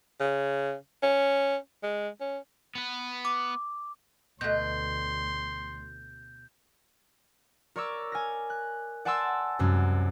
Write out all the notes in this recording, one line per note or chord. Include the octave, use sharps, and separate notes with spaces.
C#3
C#4
G#3
C#4
B3 B4
D6
D2 B2 A3 C6 G6
A#4 C#5 D5 C#6 D6 E6
G#5 F6 A#6
F#6
D5 F#5 G#5 A5 C6 E6
C2 F#2 G#3